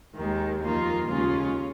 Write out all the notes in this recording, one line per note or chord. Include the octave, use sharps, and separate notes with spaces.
D#2 D#3 G#3
F2 D#3 A#3 F4
D#2 C#3 G#3 C#4 F4